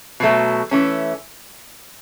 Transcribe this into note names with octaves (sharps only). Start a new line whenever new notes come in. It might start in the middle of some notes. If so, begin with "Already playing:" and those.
B2 F#3 A3
E3 A3 C#4